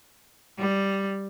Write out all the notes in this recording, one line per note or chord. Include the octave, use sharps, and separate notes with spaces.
G3